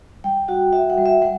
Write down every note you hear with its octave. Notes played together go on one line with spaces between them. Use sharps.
G3 G5
F#4 F#5
F#4 E5
F#5
G3
E5
G3 F#5